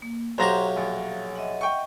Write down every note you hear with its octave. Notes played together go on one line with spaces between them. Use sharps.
A#3
B1 F#3 G4 C5 E5 F5 A#5 A#6
A#1
D#5 E5 F#5
G5 C#6